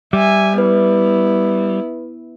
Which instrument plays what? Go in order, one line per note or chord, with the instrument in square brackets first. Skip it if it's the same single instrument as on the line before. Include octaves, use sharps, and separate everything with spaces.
[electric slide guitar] G3 [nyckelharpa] E5 G#5
[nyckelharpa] B3 E4 [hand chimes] B4